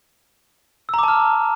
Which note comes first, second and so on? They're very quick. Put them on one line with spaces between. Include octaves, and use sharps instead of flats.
E6 A#5 D6 A5 F6